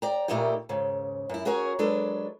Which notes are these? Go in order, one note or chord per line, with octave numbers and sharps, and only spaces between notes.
D5 G5 A#5
A#2 A3 A#3 D#4 E4 G4
D#2 G#2 C#3
F#2 E4
C#4 F#4 G#4 A#4 C#5
F#3 G#3 D4 A4 B4